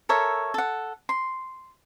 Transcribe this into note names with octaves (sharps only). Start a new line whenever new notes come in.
A4 A#4 C#5 E5
A4 F#5
C6